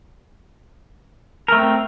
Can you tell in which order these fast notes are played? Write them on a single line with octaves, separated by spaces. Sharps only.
A#4 A3 C4